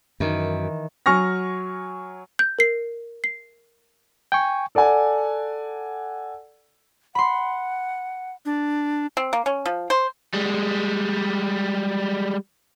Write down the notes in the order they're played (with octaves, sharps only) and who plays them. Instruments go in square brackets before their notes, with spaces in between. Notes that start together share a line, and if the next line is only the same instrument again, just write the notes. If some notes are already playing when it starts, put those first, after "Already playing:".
[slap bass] F#2 [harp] D#3 E3
[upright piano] F#3 G#5 C#6 F6 A#6
[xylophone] G6
A#4 C7
C7
[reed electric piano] G5 G#5 C#6
[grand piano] A4 D5 F#5 G#5
[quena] F#5 [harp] B5 C6
[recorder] D4
[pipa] C4
A#3
C#4
F3
C5
[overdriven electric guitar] G3 G#3